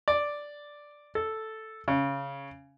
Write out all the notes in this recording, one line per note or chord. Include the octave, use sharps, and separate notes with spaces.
D5
A4
C#3